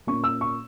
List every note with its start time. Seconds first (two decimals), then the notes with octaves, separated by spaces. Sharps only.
0.07 A#2 A#3 C#4 C#6
0.24 E6
0.41 C#6